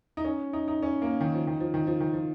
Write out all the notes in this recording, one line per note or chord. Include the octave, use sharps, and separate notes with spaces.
D#4
C#4
D#4
D#4
C#4
A#3
D#3
F3
D#3
F3
D#3
F3
D#3
F3